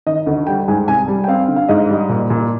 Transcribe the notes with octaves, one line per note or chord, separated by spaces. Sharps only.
D#3 D#5
D2
G3 G5
G#2 G#5
C2 G#5
G3
G5
C4 F5
D3
F5
G#2 D#5
G3
A#2
A#2